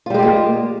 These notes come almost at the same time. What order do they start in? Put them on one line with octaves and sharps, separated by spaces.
F4 G3 G#3 G4 A#3